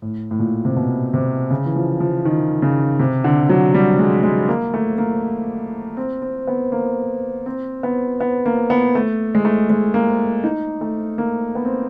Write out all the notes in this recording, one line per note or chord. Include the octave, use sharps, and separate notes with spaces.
A2
A2
A#2
C3
B2
C3
C#3
E3
F3
F3
D#3
C#3
C3
D3
F#3
G3
G#3
G#3
A#3
A3
A#3
C4
C4
B3
A#3
C4
B3
B3
A#3
B3
A3
G#3
A3
G#3
A#3
D#4
A3
A#3
B3
C4